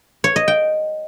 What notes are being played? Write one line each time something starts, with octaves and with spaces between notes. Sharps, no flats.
C#5
D#5
G5